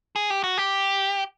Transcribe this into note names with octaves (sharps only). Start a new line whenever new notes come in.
G#4
G4
F#4
G4